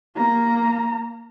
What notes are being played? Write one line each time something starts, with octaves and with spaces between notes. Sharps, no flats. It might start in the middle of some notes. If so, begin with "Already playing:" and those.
A#3 A#5